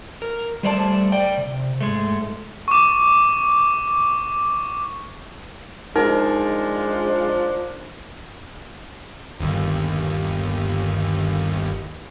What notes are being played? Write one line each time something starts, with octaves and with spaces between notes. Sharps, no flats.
A#4
G3 A3 C5 D5 F#5 A5
D5 G5
C3
G#2 G#3 A3
C#6 D6
F3 G#3 D4 D#4 A#4
G1 D#2